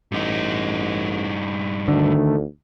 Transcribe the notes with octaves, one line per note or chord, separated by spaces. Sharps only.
A1 G2 D#4
D2 D3 D#3 A3